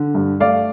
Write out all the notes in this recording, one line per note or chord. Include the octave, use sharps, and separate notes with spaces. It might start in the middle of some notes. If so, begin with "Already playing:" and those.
Already playing: D3
G2
A3 D5 F5